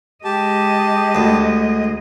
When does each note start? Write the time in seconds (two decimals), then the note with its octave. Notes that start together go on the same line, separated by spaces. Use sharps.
0.24 G#3 G4 D#5 A5
1.15 D2